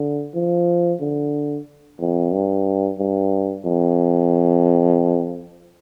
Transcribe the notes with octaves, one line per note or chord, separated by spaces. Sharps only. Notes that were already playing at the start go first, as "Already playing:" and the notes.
Already playing: D3
F3
D3
F2
G2
G2
F2